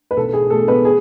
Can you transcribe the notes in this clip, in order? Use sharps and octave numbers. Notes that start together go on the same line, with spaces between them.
B4
B1 A4
G#4
B2 A3 A4
B3 B4
G#4